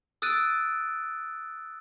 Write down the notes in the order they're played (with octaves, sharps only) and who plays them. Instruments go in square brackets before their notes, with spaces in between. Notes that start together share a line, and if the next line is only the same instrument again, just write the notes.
[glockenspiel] D#6 E6 F#6 A6 D7 D#7